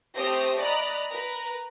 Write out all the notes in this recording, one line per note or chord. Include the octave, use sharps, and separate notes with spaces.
A3 C4 G4 C5 D#6 A#6
D5 D#5 A#5 B5 F#6
A#4 B4 A#5